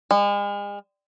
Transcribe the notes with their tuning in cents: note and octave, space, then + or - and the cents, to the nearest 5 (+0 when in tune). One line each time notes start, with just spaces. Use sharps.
G#3 -40